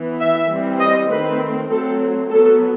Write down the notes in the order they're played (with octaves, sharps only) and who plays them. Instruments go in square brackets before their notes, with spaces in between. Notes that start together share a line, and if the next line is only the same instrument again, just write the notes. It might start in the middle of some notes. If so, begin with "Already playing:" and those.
Already playing: [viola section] E3 B3
E5
E3 G3 C4
D#5
D#3 A3 C4 B4
F#3 A3 C4 A4
F#3 B3 A4